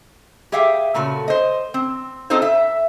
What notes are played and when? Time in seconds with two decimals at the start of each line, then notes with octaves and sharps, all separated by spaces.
0.52 G4 G#4 E5 F5 G5
0.94 A#2 C#3 A3 F#4
1.28 C5 D#5
1.74 C4
2.30 C4 D#4 F4 A4 C5
2.42 E5